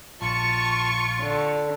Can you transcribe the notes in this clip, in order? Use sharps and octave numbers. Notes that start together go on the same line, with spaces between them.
A#1 F4 A5 C#6
D3